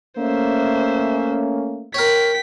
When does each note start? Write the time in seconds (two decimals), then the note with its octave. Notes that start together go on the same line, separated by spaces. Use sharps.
0.19 A3 A#3 C#4 C5 E5
1.94 A#4 C#5 G5 B6